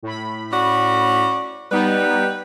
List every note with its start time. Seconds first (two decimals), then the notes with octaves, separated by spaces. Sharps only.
0.02 A2 B5
0.51 C#4 F#4 D5
1.71 G3 B3 D#4 G4 B4